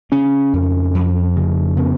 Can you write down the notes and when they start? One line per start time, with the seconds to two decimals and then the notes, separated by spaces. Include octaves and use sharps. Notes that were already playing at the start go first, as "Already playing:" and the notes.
0.12 C#3 C#4
0.53 F2
0.95 F2
1.36 C#3
1.77 C#3 B3